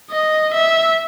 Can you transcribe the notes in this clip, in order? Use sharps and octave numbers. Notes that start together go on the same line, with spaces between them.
D#5
E5